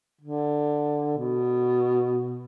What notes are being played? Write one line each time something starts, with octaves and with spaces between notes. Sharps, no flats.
D3
B2